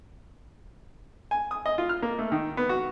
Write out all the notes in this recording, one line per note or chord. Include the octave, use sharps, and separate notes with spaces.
G#5
D#6
D#5
F4
F6
A#3
A3
D#3
B3
F#4